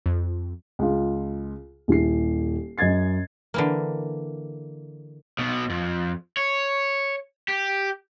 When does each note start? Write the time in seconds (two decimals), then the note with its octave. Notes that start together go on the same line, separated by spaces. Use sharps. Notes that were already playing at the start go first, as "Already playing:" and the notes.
0.06 F2
0.79 C#2 F4
1.88 D#1 E4 C7
2.78 F#2 D#5 G#6 A6 C7
3.54 D3 E3 A#3
5.38 B1 B2
5.70 F2
6.37 C#5
7.48 G4